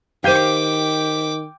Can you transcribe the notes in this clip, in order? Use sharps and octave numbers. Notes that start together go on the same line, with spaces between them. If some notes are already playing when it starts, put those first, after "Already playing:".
D#3 G4 C5 F5 G5 D6 G6 D#7